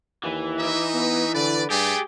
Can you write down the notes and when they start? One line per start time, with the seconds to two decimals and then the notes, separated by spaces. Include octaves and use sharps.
0.23 D#2 E3
0.59 D#4 D#5 E5
0.94 B3
1.35 D3 B4 D5
1.70 G2 A3 G4 G#4